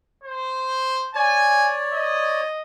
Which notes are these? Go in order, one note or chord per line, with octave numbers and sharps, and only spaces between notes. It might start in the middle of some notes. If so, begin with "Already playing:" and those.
C5
C#5 D5 G#5
D#5